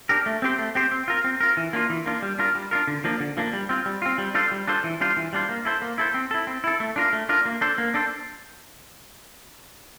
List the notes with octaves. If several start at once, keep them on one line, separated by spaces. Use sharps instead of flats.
D4 G4 A#4
A3
C4 G4 C5
A3
C4 G4 C5
C4
F4 A#4
C4
F4 A#4
E3
A#3 D4 F4
E3
A#3 D4 F4
G3
D4 F4 A#4
G3
D4 F4 A#4
D3
F3 A#3 D4
D3
F3 A#3 D4
G3
C4 F4
G3
C4 F4
G3
D4 F4 A4 C5
G3
D4 F4 A4 C5
E3
G3 D4 F4 C5
E3
G3 D4 F4 C5
A#3
E4 A4 C5
A#3
E4 A4 C5
C4
E4 A4
C4
E4 A4
A3
D4 F4 A#4
A3
D4 F4 A#4
A#3
D4 A4 C5
A#3
D4 A4 C5